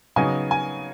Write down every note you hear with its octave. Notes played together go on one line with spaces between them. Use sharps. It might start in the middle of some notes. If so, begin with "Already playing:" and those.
C#3 F#3 B3 D#4 G#5
G#5